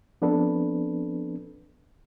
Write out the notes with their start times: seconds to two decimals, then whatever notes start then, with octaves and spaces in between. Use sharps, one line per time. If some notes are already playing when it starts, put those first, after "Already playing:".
0.22 F3 B3 C4 D4 A4 B4